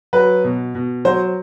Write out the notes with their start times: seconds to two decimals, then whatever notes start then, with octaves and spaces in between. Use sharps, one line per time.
0.13 F#3 B4
0.44 B2
0.75 B2
1.05 F#3 C5